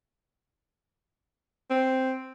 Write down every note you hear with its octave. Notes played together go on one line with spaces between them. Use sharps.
C4